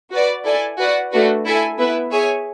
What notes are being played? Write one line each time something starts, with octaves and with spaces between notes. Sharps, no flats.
F#4 B4 D5
E4 A4 D5 G#5
F#4 B4 D5 F#5
A3 D4 F#4 B4
E4 A4 E5 G#5
B3 E4 B4 E5
G#4 C#5 E5 G#5